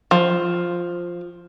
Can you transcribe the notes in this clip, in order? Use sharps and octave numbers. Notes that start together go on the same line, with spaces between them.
F3